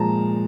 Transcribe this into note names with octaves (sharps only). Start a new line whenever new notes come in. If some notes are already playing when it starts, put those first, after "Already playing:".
Already playing: A#2 F3 G#3 A5 A#5